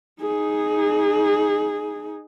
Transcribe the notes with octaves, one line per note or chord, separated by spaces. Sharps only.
D#4 G#4